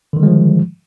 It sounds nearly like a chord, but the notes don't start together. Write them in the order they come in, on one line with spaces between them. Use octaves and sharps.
D3 D#3 G3 G#3 F3